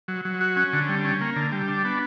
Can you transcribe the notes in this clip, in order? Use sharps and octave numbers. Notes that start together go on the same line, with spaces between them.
F#3
F#3
F#4
C#4
D3
G3
C#4
A#3
D3
G3
D4
B3